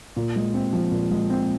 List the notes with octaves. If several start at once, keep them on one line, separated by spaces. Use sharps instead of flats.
A#2
G#3
C4
F3
A#2
G#3
C4